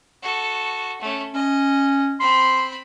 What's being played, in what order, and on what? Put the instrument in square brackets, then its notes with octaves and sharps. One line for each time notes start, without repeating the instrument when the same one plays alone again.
[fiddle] F#4 A4
A3 C#4
[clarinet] C#4 [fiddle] D#5
[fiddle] C4 B5 [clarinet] C6